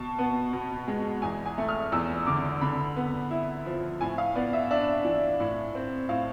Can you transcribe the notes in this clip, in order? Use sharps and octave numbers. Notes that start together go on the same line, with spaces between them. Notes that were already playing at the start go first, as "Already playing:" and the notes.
Already playing: B2 A5
B3
B2
G#3
E2 G#5
G#5
A3
F6
E2 E6
D3 D6
D3 B5
B3
E4
F3
A2 G#5
F5
B3 D5
E5
D4 E5
E3
A2
C4
A2 F5